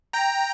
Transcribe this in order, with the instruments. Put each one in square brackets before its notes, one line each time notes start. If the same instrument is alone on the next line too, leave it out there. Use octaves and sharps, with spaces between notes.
[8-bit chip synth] G5 A#5